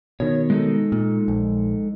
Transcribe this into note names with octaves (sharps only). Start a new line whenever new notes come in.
B2 D#3 C#5
G#3 D#4 A4
A#2
A#1